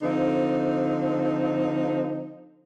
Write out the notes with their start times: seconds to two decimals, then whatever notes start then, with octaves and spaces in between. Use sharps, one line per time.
0.02 D3 F3 C4 D#4